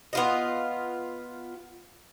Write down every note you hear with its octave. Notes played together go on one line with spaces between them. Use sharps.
B3 F4 D#5